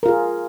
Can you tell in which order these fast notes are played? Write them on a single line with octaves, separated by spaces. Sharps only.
A#4 F4 G#4